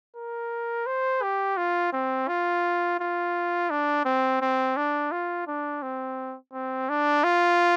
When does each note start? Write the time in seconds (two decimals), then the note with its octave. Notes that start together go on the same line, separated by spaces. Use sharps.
0.16 A#4
0.86 C5
1.22 G4
1.57 F4
1.93 C4
2.28 F4
3.00 F4
3.70 D4
4.05 C4
4.41 C4
4.77 D4
5.11 F4
5.47 D4
5.82 C4
6.53 C4
6.89 D4
7.24 F4